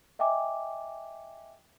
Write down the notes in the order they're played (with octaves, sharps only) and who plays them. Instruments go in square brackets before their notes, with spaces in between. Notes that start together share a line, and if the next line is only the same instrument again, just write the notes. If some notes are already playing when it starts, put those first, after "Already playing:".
[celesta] D#5 E5 G5 G#5 D6